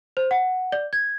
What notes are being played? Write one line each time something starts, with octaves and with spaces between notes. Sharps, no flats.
C5
F#5
D5
G#6